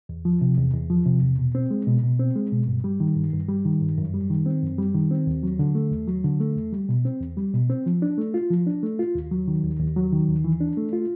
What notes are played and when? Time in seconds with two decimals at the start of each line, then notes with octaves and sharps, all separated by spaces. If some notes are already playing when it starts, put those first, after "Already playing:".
0.09 E2
0.25 F3
0.41 C3
0.58 E2
0.74 E2
0.90 F3
1.06 C3
1.22 E2
1.38 B2
1.55 C4
1.71 G#3
1.87 B2
2.03 B2
2.19 C4
2.36 G#3
2.52 B2
2.68 G2
2.84 G3
3.00 D#3
3.16 G2
3.33 G2
3.49 G3
3.65 D#3
3.81 G2
3.98 F#2
4.14 G3
4.30 D#3
4.46 C4
4.62 F#2
4.78 G3
4.94 D#3
5.11 C4
5.27 D#2
5.43 F#3
5.59 D3
5.75 A3
5.91 D#2
6.08 F#3
6.24 D3
6.40 A3
6.56 E2
6.73 G3
6.89 B2
7.05 C4
7.21 E2
7.37 G3
7.54 B2
7.70 C4
7.86 F3
8.02 D4
8.18 A3
8.34 F4
8.51 F3
8.67 D4
8.83 A3
8.99 F4
9.15 D#2
9.31 F#3
9.48 D#3
9.63 D#2
9.80 D#2
9.96 F#3
10.12 D#3
10.29 D#2
10.44 E3
10.60 D4
10.77 A3
10.93 F4